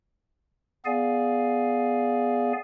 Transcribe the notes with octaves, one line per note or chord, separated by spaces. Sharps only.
B3 G#4 D5 F5 G#5